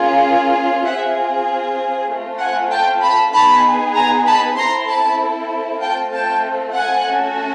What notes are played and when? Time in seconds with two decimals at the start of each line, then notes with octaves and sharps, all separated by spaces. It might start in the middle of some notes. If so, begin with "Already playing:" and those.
Already playing: A#3 C#4 F4 G#4
0.85 C4 F4 G#4 E5 F#5
2.09 A3 C4 F4 A4
2.40 F#5 G#5
2.72 G5 A5
3.03 A5 B5
3.33 B3 D#4 G#4 A5 B5
3.96 G#5 A#5
4.27 A5 B5
4.57 C4 E4 A4 A#5 C6
4.88 A5 B5
5.82 A3 C4 F4 A4 G5 A5
6.13 G5 A5
6.76 F#5 G#5
7.06 A3 C#4 F#4 A4